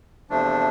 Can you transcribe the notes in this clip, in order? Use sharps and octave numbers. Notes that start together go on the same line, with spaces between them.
E2 C3 F3 A3 D4